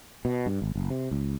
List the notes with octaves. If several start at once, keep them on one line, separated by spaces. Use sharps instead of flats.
B2
G2
G#1
F#1
C3
C#2